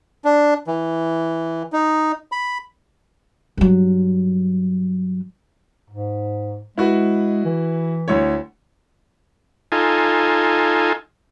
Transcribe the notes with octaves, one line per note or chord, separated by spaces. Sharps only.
D4
E3
D#4
B5
G2 F#3
G#2
G#3 E4 F#4 B4
E3
D2 E4 C#5
D#4 F4 A4 G#5